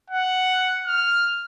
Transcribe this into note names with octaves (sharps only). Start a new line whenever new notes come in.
F#5
F6